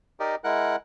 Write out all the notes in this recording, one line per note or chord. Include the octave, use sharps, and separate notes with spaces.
D#4 G4 A#4 D5 D#5
G#3 E4 A#4 F#5 F#6